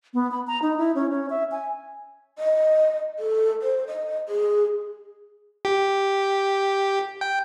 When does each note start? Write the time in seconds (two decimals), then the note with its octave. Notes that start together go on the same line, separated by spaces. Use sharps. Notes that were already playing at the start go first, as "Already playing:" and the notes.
0.14 B3
0.31 B5
0.47 A#5
0.62 D#4
0.78 E4
0.95 C#4
1.10 C#4
1.30 E5
1.52 G#5
2.39 D#5
3.19 A4
3.62 C5
3.88 D#5
4.29 G#4
5.65 G4
7.21 G5